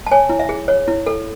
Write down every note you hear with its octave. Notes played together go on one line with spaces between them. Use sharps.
A5
C#5 G#5
E4
E5
G#4
C#5
E4
A4